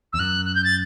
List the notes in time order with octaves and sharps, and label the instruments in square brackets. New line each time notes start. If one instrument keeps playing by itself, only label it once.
[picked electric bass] E2 [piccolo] E6
[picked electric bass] F#2 [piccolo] F#6
[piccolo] F#6
G6
A6